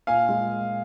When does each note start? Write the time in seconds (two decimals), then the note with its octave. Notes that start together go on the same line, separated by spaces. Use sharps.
0.07 A#2 F5 G#5
0.29 G#3